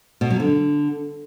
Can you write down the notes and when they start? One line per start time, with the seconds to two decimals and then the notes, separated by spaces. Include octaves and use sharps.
0.21 B2
0.30 F#3
0.40 D3